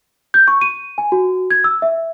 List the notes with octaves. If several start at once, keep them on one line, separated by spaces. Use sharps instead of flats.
G6
C#6
D#7
G#5
F#4
G#6
E6
E5